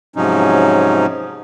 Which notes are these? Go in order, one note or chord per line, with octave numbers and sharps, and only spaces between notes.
G#2 C3 F3 F#3 C#4 D#4